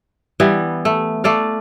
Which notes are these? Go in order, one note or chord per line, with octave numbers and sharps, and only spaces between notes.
E3 G3 B3
A3
A3 D5 F5